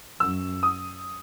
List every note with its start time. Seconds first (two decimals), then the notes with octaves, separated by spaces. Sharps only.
0.20 F#2 E6
0.63 D#6